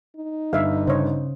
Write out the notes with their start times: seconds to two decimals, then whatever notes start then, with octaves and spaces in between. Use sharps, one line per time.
0.17 D#4
0.53 G1 E5 F5
0.87 C#3 C5 C#5